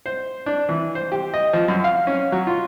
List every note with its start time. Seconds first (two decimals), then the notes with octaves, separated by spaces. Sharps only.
0.06 C5
0.46 D4
0.69 E3
0.95 C5
1.12 G4
1.34 D#5
1.53 F3
1.68 F#2
1.84 F5
2.07 C#4
2.32 F#3
2.47 F4